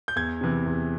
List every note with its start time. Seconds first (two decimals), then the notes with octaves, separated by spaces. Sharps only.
0.08 G6
0.16 E2 G#6
0.41 C3 E3
0.66 E2